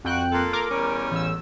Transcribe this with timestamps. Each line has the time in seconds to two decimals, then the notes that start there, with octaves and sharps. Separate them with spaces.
0.05 F2 F#4 G5 F#6
0.32 A#3 F4 A4
0.53 A#4 D6
0.70 E2 G3 C#4
1.12 A1 E6